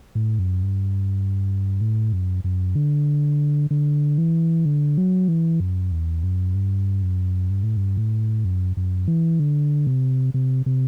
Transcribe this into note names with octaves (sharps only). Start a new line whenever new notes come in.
A2
F#2
G2
A2
F#2
F#2
D3
D3
E3
D3
F#3
E3
F#2
E2
F#2
G2
F#2
G2
A2
G2
A2
F#2
F#2
E3
D3
C3
C3
C3